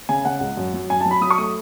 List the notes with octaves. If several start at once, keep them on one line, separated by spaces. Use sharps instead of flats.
C#3 G#5
C#3 F#5
C#2
F#2
F#3
F#2 G#5
A5
F#3
B5
F#3 D#6
C#6
A3 D#6